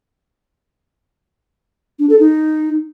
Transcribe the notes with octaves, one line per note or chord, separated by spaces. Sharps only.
D4
A4
D#4